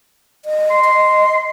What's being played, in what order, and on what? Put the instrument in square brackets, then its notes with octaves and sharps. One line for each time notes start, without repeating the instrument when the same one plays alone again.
[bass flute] D#5
[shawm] C6
[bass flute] D#5